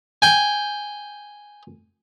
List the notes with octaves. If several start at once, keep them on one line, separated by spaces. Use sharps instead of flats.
G5 G#5